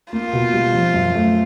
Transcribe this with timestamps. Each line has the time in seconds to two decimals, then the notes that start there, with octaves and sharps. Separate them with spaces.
0.13 A#3 F4
0.33 B2
0.53 G3
0.74 F3
0.94 F#2
1.15 A3